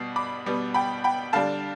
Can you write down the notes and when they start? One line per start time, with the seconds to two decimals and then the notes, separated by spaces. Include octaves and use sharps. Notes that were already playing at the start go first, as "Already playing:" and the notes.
Already playing: B2 G3 B3 C7
0.16 B5 D6
0.46 B2 G3 B3
0.74 G5 B5
1.04 G5 B5
1.33 D3 G3 D4 F5 A5